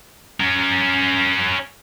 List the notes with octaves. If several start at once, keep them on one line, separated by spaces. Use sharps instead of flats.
C#4 A#4